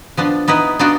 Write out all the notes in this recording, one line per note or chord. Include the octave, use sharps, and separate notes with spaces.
F3 B3 D4
B3 D#4 E4 B4
B3 D4 D#4 F4 F#4 G5